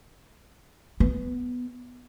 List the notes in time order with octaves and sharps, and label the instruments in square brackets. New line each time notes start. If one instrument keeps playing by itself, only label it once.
[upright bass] B3